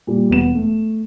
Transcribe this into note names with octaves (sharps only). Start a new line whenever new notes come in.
A#2 G3
E1 B3 E7
A3